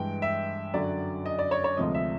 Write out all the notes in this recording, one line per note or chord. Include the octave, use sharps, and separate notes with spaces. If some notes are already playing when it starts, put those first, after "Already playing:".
Already playing: G2 E3 G#3 G5
E5
F#2 D3 F#3 D5
D#5
D5
C#5
C#5
D2 C3 F3 G#3 D#5
E5